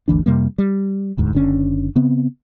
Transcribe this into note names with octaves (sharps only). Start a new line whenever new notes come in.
G1 D2 E3 D4
F2 C3 G3 A#3
G3
E1 D2 G#2
F#1 D3 C#4
C#3 B3 C4